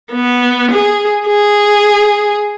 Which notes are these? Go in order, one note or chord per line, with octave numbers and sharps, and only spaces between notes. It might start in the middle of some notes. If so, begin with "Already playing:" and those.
B3
G#4
G#4